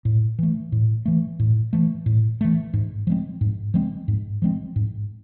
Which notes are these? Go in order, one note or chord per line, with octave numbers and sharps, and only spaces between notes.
A2
E3 A3
A2
E3 A3
A2
E3 A3
A2
E3 A3
G#2
F3 G#3 C4
G#2
F3 G#3 C4
G#2
F3 G#3 C4
G#2